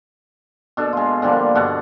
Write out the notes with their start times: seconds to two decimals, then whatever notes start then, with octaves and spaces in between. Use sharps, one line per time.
0.77 B2 D4 A4
0.93 G#3 F4
1.22 D3 F3 G3 A#3
1.55 G2 B2 D3 F#5